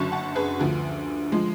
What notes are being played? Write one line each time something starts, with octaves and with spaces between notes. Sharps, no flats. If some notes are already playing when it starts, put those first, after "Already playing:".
Already playing: F#1 F#2 D3 F#3 A5 C#6
F#5 A5
G#4 B4
D2 D3 F3
F3 G#3